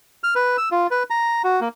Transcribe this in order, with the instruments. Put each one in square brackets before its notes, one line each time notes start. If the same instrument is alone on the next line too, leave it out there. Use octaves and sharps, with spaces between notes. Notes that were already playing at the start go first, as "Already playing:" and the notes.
[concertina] F6
B4
E6
F4
B4
A#5
F#4
A#3